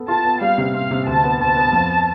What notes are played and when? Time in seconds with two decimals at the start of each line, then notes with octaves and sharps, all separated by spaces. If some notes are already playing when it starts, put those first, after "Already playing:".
Already playing: B3 A4
0.08 F4 A5
0.25 B3
0.41 G3 F5
0.58 C3
0.74 C4 F5
0.91 C3
1.07 D2 A5
1.24 B3
1.40 D2 A5
1.57 B3
1.73 F2